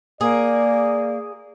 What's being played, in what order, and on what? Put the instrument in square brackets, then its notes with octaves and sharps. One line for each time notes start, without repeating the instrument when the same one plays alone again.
[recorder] A#3 [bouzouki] G#4 [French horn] D5